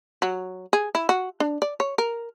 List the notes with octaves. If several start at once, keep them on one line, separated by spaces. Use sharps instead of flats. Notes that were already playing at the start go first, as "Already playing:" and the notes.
F#3
G#4
E4
F#4
D4
D5
C#5
A#4